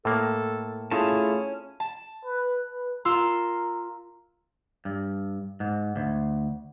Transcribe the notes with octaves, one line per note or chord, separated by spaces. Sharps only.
A2 A#3 A4
A3 C#4 E4 F4 G#4 A5
A5
B4
B4
F4 A#4 C6 E6
G2
G#2
D2